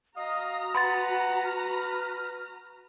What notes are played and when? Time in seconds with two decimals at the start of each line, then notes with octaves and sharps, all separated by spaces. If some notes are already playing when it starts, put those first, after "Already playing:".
0.16 F#4 D#5 F5 A#5 D#6
0.75 B4 F#5 B5 C6 A6
1.45 F6